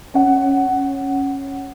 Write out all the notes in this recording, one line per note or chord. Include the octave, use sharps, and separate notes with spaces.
C#4 F#5